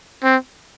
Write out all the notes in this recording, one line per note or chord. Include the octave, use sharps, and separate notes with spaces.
C4